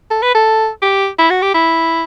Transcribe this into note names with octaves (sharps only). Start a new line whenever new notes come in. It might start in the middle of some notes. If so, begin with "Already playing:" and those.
A4
B4
A4
G4
E4
F#4
G4
E4